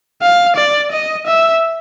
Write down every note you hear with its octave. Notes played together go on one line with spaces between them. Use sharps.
F5
D5
D#5
E5